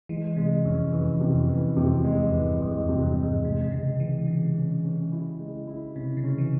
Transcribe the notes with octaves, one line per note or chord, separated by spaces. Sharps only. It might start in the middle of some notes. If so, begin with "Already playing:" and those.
E3 G#3
C3 G#3
F2 C#4
F2 E3
C3
F2
E3
F2 C3
E2
G#3
F2
E3
G2
E2 G#3
F2
C3
G2
G#3
G#2
C3 G#3
C3
C#3 G#3
E3 G#3
C#3 G#3
C#4
C#4
E4
G#3
E4
C3 C#4
C#3
C#4
E3